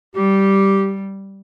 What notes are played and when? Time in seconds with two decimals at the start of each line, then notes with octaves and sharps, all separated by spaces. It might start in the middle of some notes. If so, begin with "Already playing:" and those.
0.15 G3 G4